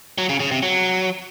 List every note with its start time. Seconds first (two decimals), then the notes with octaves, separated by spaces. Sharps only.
0.18 F#3
0.29 C#3
0.40 C#3
0.51 C3
0.63 F#3